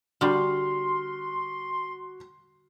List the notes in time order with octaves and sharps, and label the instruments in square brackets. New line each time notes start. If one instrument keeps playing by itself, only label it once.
[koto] D3 G3 [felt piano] F#4 F6 [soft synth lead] C6